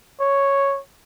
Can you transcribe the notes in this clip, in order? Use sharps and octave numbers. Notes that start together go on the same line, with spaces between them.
C#5